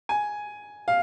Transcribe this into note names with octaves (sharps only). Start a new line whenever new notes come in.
G#5
F5